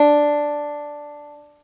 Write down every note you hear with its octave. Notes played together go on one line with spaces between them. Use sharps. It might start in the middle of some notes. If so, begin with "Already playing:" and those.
Already playing: D4